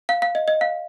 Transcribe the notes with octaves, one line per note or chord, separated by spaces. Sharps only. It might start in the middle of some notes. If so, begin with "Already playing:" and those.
F5
F5
D#5
D#5
F5